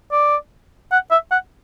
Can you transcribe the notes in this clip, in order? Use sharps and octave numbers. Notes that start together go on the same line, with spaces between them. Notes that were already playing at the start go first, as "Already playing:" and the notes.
D5
F#5
E5
F#5